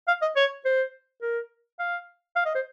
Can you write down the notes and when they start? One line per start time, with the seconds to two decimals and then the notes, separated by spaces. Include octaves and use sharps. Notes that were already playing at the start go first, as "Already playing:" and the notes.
0.08 F5
0.22 D#5
0.36 C#5
0.65 C5
1.22 A#4
1.79 F5
2.36 F5
2.46 D#5
2.55 C5